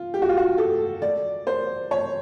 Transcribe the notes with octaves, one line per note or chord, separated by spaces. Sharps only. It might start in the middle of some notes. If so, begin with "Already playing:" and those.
Already playing: F4
G4
F#4
F4
F#4
A4
D5
C5
C#5